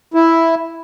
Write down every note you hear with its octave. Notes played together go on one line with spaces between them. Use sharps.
E4